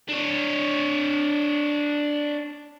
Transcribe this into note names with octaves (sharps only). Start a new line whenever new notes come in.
D4 C#5